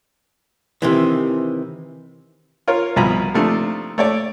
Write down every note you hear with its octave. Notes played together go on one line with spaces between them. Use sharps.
C3 D#3 E3
F4 A#4 C#5
C2 B2 F3 G#5 A#5 B5
C3 F3 A3 D4 D#4
A3 C#5 D5